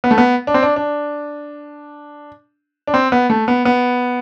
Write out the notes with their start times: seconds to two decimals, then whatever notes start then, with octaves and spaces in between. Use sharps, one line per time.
0.04 B3
0.11 A3
0.18 B3
0.47 D4
0.54 C4
0.63 D4
0.76 D4
2.87 D4
2.94 C4
3.12 B3
3.30 A3
3.48 B3
3.65 B3